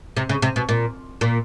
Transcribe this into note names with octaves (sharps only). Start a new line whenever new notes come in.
C3
C#3
C3
B2
A#2
A#2